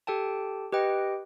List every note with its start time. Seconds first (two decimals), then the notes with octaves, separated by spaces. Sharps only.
0.07 G4 A4 G5 A5
0.72 G4 B4 D#5 G5